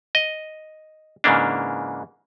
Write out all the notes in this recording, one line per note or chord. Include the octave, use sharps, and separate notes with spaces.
D#5
G#2 C#3 E3 A#3 D4